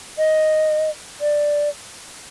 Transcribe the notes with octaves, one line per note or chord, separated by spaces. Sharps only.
D#5
D5